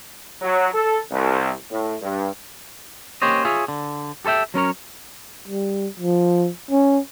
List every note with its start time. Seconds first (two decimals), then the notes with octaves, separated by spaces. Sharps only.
0.42 F#3
0.74 A4
1.11 C2
1.70 A2
2.01 G2
3.22 A#3 C#4 G4 C5 C#5 D#5
3.45 F4 G#4 C#5 E5
3.68 D3
4.25 G4 A4 C5 E5 G5
4.54 F#3 C#4 A#4 C#5
5.48 G3
6.00 F3
6.71 C#4